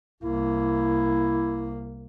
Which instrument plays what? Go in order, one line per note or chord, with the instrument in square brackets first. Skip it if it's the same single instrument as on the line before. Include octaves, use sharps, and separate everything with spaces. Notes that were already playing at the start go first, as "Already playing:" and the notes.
[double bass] C2 A#3 [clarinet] E4